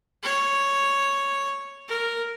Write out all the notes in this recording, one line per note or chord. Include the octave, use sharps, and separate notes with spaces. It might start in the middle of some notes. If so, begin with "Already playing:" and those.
C#5
A#4